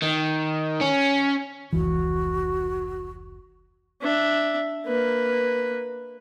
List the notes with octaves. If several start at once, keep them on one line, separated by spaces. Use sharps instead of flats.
D#3
C#4
F1 C#2 E3 F#4
D4 E5
A#3 B4